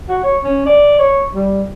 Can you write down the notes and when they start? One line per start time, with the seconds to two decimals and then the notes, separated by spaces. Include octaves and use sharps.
0.09 F#4
0.23 C#5
0.44 C#4
0.66 D5
0.99 C#5
1.34 G3